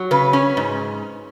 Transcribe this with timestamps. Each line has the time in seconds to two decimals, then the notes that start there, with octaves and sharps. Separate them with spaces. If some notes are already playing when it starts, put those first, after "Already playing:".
Already playing: F#3
0.11 C#3 B4
0.33 C#4
0.57 G#2